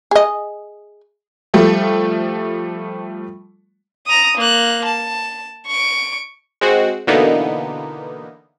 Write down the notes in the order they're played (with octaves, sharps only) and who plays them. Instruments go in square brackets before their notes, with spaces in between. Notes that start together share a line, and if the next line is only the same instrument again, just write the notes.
[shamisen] G#4 D#5
[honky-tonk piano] F3 G3 A3
[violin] A#5 D#6
A#3 F#6
A5
C#6 D7
[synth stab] G#3 C4 F#4
B2 D3 E3 A#3 B3 D#4